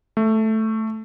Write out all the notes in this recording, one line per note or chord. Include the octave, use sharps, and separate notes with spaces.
A3